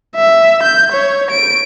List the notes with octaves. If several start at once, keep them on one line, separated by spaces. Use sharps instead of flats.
E5
G6
C#5
D7